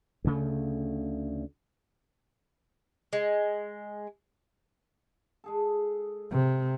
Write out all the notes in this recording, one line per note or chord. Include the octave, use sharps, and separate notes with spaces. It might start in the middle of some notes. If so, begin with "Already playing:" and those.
D2 C#3 A3
G#3
G#3 G#4 A4
C3